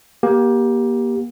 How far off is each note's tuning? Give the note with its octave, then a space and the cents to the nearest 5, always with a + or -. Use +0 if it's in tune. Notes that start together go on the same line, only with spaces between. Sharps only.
A#3 +30 G4 +0